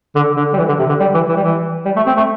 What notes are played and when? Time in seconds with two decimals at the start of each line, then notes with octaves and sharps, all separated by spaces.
0.15 D3
0.37 D3
0.53 G3
0.58 E3
0.68 D3
0.79 C3
0.89 D3
1.00 G3
1.14 E3
1.29 E3
1.37 G3
1.43 E3
1.85 G3
1.96 A3
2.06 C4
2.17 A3